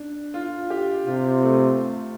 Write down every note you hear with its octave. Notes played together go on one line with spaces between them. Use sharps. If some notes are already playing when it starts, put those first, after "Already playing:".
Already playing: D4
F4
G4
C3 F4
A3